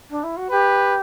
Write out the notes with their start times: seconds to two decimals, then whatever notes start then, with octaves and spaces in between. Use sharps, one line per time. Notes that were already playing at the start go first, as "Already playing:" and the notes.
0.10 D4
0.23 E4
0.36 F#4
0.50 G4 B4